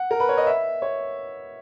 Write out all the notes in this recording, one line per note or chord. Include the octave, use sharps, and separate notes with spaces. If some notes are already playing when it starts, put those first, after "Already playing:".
Already playing: F#5
A#4
B4
C#5
D#5
E5
C#5